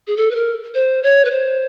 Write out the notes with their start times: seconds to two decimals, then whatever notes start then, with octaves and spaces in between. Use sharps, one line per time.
0.07 G#4
0.17 A4
0.31 B4
0.35 A#4
0.75 C5
1.03 C#5
1.25 B4
1.31 C5